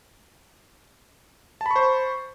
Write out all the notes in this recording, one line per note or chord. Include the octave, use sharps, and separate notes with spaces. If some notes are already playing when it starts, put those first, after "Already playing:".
C5 A5 B5 C#6